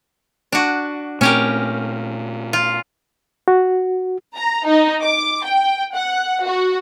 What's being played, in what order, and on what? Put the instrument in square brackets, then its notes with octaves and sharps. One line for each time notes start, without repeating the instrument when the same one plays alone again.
[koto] D4 F#4
[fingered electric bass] A#2 A3 C4 [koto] C#4 G4 A#4
[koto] F4
[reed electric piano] F#4
[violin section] A#5
D#4
D6
G5
F#5
F#4